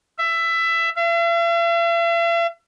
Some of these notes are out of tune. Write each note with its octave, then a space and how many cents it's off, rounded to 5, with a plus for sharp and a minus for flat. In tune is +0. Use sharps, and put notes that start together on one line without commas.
E5 +15
E5 +45